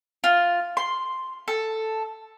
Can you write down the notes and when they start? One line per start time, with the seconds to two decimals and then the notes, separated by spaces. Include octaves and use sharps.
0.24 F4
0.77 C6
1.48 A4